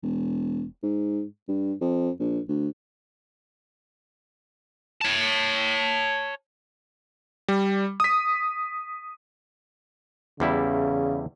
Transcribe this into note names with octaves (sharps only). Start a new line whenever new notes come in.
E1
G#2
G2
F2
A#1
D2
C#5 A5
G3
D#6 B6
E2 C#3 G3 E4